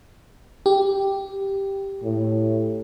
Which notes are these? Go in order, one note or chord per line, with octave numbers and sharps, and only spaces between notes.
G4
A2